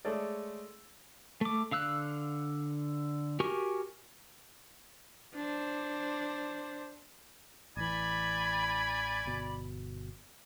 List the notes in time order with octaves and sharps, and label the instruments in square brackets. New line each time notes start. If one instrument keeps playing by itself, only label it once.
[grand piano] G#3 A3 G#4 A4 C#5 D5
[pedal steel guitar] A3 D6
D3 F5 E6 F#6
F#4 G4 A#4 G#5 C#6
[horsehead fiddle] D4 C5
[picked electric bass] A1 E3 [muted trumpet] D5 [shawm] G#5 [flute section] B5
[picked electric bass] G1 B2